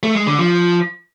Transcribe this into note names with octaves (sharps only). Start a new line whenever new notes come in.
A3
G#3
D3
F3